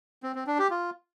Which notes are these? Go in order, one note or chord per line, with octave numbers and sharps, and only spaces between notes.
C4
C4
D4
G4
F4